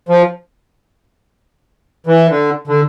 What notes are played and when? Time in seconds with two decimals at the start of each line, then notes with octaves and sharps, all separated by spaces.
0.09 F3
2.06 E3
2.30 D3
2.67 D3